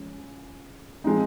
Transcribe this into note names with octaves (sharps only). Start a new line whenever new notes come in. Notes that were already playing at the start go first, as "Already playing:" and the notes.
Already playing: F3 G#3 C#4
F3 G#3 C4 D#4